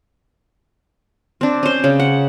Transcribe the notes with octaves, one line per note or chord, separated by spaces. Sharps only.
C4 D4
C#4 C5
C#3
F#5